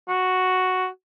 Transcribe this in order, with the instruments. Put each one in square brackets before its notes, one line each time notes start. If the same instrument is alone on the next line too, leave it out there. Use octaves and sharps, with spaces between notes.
[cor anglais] F#4